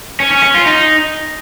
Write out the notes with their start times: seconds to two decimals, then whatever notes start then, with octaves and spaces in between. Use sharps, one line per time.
0.20 C#4
0.32 C#4
0.43 C#4
0.54 F4
0.66 D#4